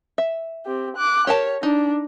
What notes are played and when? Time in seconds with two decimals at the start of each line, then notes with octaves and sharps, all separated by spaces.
0.18 E5
0.65 C4 G4
0.97 D6 F#6
1.27 G4 A#4 C#5 A5
1.63 D4 D#4